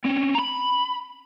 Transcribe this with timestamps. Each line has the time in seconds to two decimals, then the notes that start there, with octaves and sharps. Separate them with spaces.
0.04 C4 C#4
0.35 A#5 B5